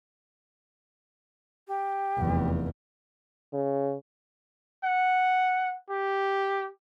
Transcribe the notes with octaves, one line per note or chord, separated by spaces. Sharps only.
G4
F1 E2
C#3
F#5
G4